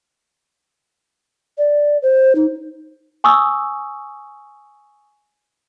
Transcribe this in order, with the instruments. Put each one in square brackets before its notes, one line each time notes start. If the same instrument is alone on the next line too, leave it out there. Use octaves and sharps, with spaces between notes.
[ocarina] D5
C5
D#4
[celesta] G#5 C#6 D#6 E6